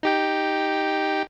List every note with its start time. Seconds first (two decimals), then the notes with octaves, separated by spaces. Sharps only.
0.03 D#4 G4 G5